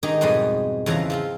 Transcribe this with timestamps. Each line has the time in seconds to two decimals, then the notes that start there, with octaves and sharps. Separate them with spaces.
0.03 D#3 D#4 G4 G#4 A#5
0.21 F2 G#2 B2 G3 G#3 G#5
0.86 E2 C#3 F3 E5 A#5
1.10 F3 C4 F4